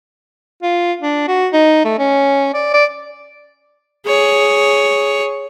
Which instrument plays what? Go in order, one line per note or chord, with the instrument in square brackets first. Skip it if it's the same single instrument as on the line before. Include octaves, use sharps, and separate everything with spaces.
[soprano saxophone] F4
D4
F#4
D#4
A3
C#4
D5
D5
[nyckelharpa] G#4 C#5